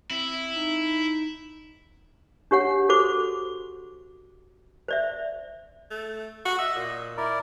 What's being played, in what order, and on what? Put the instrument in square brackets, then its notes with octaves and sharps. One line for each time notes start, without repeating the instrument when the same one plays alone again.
[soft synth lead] C4 [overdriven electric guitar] E4
[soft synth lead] D#4
[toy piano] D4 G4 C#5 F#5
F#4 A4 C5 D6
C5 D5 E5
[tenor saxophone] A3
F#4
[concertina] D#5 [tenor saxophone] E5
[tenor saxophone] A#2
[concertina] E4 A#4 D5